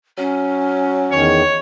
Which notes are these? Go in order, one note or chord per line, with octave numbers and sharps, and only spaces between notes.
F#3 C#4
E2 D#3 C#5